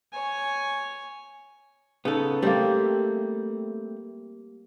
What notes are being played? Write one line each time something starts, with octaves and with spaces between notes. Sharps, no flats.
C#5 G#5
C#3 B3 D#4 A4
G3 A3 A#3 C4